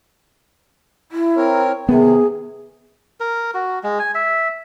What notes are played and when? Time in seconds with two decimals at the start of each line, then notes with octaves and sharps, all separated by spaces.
1.12 E4
1.37 C4 A#4 C#5
1.89 C3 D#3 B3 G#4
3.20 A#4
3.54 F#4
3.84 G#3
3.99 G#5
4.15 E5